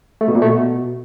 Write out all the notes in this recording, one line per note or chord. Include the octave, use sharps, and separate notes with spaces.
A3
B2
A#2
A3
B2